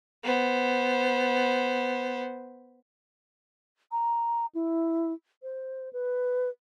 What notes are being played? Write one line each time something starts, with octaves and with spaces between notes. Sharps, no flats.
B3 C5
A#5
E4
C5
B4